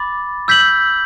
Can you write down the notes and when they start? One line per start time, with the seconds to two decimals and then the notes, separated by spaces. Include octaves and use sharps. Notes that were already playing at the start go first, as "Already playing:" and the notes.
Already playing: B5 D6 A6
0.48 E6 G6 B6 F#7